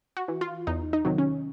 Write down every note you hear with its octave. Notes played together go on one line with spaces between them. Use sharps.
F#4
E3
F4
E2 D#4
D#4
C3 D#3 F#3
C#4